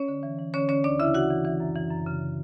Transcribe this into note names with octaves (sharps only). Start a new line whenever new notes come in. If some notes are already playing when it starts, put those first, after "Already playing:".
Already playing: C#4 C#5
D3
E3
E3
D3 C#4 C#5
D3 C#4 C#5
D2 D4 D5
C#3 E4 E5
E3 F#4 F#5
E3
E3
F#2
E3
F#2
C#3